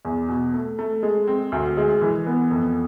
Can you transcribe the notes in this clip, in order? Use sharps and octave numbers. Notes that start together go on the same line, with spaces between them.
E2
B2
A3
A3
G#3
C4
D2
G#3
E3
B3
F2